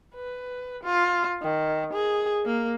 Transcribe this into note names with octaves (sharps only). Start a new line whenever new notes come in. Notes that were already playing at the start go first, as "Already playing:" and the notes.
B4
F4
D#3
G#4
A#3